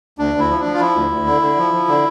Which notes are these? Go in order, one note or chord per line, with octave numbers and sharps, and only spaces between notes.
D2 D4
D2
E4
F3
D4
F3
F4
F3 E4
D2
D2
D3
D3
F3
F3
D3